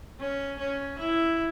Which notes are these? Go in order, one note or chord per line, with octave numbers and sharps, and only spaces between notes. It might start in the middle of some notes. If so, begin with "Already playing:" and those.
C#4
C#4
E4